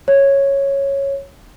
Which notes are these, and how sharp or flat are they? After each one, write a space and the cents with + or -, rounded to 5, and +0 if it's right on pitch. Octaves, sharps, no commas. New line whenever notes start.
C#5 -5